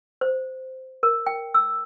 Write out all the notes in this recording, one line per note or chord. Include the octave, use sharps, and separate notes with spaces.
C5
A#4
G5
E6